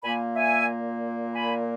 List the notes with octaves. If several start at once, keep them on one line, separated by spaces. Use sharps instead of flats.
A#2 A#3 G#5 B5
E5 G#5
G#5 B5